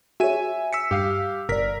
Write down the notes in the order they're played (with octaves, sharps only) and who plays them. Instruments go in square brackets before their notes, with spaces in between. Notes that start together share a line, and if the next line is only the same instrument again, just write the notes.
[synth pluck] F#4 G#4 C#5 [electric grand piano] E5 G#5 D#7
[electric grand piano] E6 B6 C#7
[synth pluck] G2 D#6 C7 [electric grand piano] G4 F5
[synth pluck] G1 D5 [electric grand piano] A#4 B6